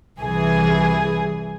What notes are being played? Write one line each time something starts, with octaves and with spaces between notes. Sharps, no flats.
C2 E3 G#4